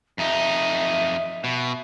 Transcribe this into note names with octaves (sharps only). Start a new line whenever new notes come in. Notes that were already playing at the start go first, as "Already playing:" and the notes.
F2 D#4 E5
B2